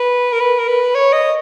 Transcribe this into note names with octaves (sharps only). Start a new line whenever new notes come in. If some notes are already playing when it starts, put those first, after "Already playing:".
Already playing: B4
A#4
B4
A#4
B4
C#5
D#5